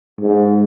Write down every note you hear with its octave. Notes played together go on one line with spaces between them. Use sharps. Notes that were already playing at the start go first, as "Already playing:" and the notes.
G#2